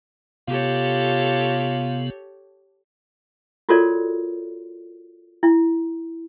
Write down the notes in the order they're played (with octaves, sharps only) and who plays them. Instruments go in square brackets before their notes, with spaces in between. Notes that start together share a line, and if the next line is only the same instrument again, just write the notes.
[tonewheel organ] C3 B3 [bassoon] F4 [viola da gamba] G4 A4 C#5
[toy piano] F4 F#4 A4 A#4 C#5 D5
E4